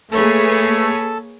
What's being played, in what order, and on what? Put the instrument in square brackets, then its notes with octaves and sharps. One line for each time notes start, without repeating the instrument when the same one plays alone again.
[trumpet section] A3 [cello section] A#3 G#4 B4 [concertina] A4 A5 [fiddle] C#5